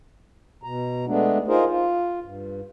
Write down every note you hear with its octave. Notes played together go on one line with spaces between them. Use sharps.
B2 A#5
G#3 A3 B3 D4
D#4 F4 G#4 A#4 C5
F4
G2